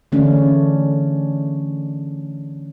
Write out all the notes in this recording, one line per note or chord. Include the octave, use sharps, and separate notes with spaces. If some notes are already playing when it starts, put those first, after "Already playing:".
D3 E3 A3 C#4 D4